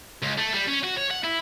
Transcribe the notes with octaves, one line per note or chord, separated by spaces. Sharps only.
C#2
A3
G3
C#4
F#4
C#5
F#5
E4